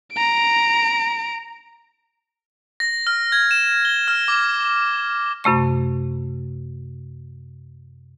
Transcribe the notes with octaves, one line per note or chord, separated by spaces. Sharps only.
A#5 D7
A#6
F6
G#6
E7
G7
F6
D6
F#2 C3 A3 C#6